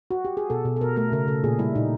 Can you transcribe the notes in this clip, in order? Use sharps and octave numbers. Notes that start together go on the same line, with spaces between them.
F#4
G4
G#4
B2 A4
B2
A4
B2 A#4
A3 A#4
C#3 A#4
C#3 A4
A#2 G#4
G3 E4
A#2 D#4